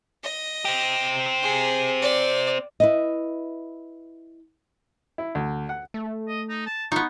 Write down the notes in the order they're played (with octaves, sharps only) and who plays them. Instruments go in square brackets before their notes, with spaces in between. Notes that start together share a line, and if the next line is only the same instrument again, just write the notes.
[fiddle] D#5
[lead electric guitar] C4 G4
[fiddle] G#4
D5
[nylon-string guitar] E4 B4 D#5
[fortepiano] E4
D2
F#5
[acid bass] A3
[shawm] D#5
D#4
A5
[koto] B3 D#4 [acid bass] F4 [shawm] C#6